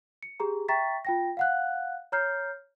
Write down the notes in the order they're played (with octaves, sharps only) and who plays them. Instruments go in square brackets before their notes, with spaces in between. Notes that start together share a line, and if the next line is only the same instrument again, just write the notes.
[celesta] C#7
G4 G#4 A#5
E5 G5 A#5 C#6 A6 B6
F4 G5 A#6
F5 F#5 F#6
C#5 A#5 F6 G6 C7